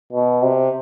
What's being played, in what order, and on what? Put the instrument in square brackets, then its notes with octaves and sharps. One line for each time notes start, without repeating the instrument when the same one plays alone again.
[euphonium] B2
C3